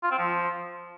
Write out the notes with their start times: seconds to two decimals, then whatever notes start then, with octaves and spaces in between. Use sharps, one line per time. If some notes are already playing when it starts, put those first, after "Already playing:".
0.03 F4
0.11 C4
0.18 F3